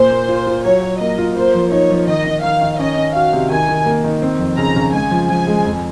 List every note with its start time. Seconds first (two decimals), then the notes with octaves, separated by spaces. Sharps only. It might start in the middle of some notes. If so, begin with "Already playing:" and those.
Already playing: A#2 C5
0.11 A#3
0.29 F4
0.47 F4
0.64 F#3 C#5
0.83 F#3
1.00 A#3 D#5
1.18 F4
1.37 A#3 C5
1.55 F3
1.72 D#4 C#5
1.90 F3
2.07 D#3 D#5
2.26 D#3
2.43 D#3 F5
2.61 D#3
2.79 C#4 D#5
2.97 C#4
3.15 F#4 F5
3.33 C3
3.50 D#3 G#5
3.68 D#3
3.86 A#3
4.04 D#3
4.22 C4
4.39 F2
4.58 C#3 A#5
4.76 C#3
4.93 G#3 G#5
5.11 F3
5.29 F3 G#5
5.47 G#3
5.65 F2